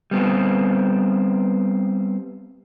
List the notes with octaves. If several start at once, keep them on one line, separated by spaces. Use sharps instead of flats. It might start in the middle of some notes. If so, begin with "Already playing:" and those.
G3 B3 C4